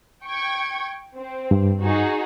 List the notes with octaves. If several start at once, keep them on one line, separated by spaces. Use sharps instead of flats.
G5 C#6 G#6
C4
G2
D#4 F#4 G#4